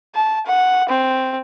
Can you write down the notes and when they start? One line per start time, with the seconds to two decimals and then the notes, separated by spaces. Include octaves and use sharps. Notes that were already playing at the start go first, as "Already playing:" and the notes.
0.15 A5
0.46 F#5
0.89 C4